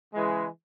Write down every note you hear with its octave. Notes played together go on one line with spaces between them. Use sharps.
C#3 E3 G#3